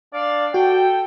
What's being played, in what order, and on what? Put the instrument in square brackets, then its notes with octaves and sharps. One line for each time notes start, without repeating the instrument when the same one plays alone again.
[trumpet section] D4 D5 F5
[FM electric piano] F#4 [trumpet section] A4 G5